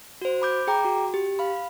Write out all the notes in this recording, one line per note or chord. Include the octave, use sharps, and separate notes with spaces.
F#4 C5
B5 D6 G6
G#4 G5 A#5 D6
F#4
G4
F5 B5